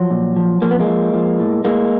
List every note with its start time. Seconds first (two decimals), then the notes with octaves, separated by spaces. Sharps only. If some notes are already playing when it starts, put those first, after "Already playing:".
Already playing: F3 F#3
0.10 A#2
0.36 F3
0.62 F3 A#3
0.71 B3
0.80 G#3 A#3
0.87 F3
1.14 F3
1.39 A2
1.64 A2 G#3 A#3